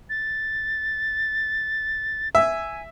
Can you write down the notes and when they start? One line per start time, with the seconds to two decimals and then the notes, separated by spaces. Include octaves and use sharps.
0.10 A6
2.35 E5 G#5